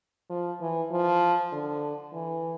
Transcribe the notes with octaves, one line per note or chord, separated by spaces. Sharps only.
F3
E3
F3
D3
E3